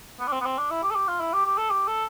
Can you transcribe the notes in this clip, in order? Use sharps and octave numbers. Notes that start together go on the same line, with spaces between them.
B3
D4
C4
B3
C4
D4
E4
G4
A4
G4
F4
E4
G4
G4
A4
G4
A4